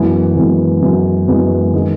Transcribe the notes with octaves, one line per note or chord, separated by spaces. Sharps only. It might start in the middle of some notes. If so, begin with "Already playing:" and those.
Already playing: F#2 E3 G#3 B3
F#2 E3 G#3 B3
F#2 E3 G#3 B3
F#2 E3 G#3 B3
D#3 G#3